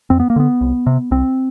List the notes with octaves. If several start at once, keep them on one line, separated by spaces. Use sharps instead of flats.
F2 C4
B3
A#3
D3 B3
C2
C3
C2 C4